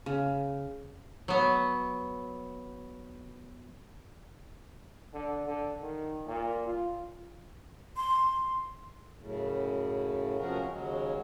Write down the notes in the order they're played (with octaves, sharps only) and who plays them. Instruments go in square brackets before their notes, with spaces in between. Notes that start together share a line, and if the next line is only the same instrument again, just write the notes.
[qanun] C#3
[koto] F#3 B3
[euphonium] D3
D3
D#3
A#2
F4
[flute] C6
[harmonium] F#2 A2 C#3
C3 F3 C#4 F#4 G#4 A#4
D#2 C#3 F#3 G#3